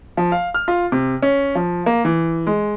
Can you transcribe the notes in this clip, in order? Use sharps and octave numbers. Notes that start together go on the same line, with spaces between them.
F3
F5
F6
F4
C3
C#4
F3
A#3
E3
G#3